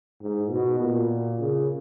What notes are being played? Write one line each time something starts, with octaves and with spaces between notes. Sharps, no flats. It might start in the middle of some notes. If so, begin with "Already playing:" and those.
G#2
B2
A#2
C#3